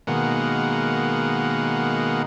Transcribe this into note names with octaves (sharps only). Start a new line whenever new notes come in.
B2 D#3 G#3 A#3 F#5